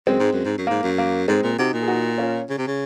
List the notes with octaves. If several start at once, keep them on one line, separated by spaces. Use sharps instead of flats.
F#2 G#3 C4
G#2
F#2
G#2
F#2
G#2 A#3
F#2
A#3
G#2 G#3 C4
A#2
C3 D#4 F#4
A#2
G#4
D#4 F#4
C#4 F4
C#3
C3
C#3